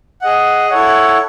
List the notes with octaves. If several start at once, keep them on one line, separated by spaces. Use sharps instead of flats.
G#4 D#5 F#5
E4 A4 C#5 F#5